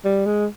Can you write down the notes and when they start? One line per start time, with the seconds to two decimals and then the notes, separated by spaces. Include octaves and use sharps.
0.05 G3
0.26 G#3